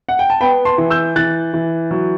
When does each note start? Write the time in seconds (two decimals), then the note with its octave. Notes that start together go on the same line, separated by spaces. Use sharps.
0.09 F#5
0.19 G5
0.30 A5
0.41 B3 G5 B5
0.65 A5 C6
0.78 E3
0.91 E6 G6
1.16 E3 F#6 A6
1.54 E3
1.91 F#3